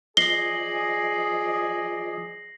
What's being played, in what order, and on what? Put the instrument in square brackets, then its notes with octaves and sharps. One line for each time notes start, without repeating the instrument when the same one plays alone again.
[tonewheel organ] F3 D#5 [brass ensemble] G#4 D5 [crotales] A#6 C7 F#7 [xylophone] G7